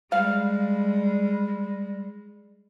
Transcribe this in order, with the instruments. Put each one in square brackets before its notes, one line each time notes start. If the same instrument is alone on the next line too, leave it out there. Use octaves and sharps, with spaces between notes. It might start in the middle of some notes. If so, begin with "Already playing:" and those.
[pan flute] G3 [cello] G#3 [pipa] F5